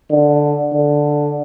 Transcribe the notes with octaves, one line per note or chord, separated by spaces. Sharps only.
D3
D3